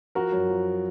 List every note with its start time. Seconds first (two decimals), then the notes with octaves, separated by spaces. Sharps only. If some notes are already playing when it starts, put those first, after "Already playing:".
0.15 F3 F#4 A#4
0.32 F#2
0.49 F3